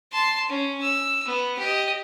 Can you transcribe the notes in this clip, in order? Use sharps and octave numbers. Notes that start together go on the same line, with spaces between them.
A5 C6
C#4
E6
B3
G4 D#5